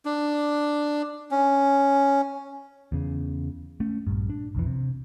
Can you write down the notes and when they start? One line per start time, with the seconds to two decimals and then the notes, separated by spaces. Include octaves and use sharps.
0.05 D4
1.31 C#4
2.92 E2 C#3
3.80 A3 C#4
4.07 A#1 G2
4.30 D4
4.55 B1 F2 E3
4.66 C3